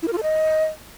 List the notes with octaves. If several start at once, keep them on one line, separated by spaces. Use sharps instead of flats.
E4
A#4
F4
A4
D#5